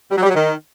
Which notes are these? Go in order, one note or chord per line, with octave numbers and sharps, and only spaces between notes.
G3
F#3
G3
F#3
D#3